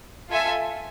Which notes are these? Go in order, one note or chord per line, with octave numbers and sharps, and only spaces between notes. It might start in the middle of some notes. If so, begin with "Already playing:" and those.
F4 A4 E5 G#5